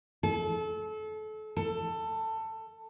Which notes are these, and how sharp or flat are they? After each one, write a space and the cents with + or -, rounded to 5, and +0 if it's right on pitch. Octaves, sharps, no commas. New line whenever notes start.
A4 -30
A4 +15